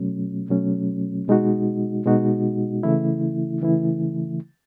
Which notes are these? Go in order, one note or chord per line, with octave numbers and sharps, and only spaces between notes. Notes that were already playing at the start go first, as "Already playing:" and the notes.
Already playing: B2 F#3 A3 C#4
B2 F#3 A3 C#4
B2 G#3 D#4 F#4
B2 G#3 D#4 F#4
C#3 E3 A3 E4
C#3 E3 A3 E4